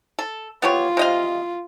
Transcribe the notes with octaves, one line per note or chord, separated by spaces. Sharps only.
A4
B3 F4 G4 C#5
C3 D#5 F5